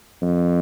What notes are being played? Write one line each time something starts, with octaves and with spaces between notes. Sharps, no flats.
F2